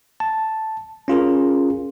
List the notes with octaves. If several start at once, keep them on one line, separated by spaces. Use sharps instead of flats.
A5
C#4 F4 G#4 A#4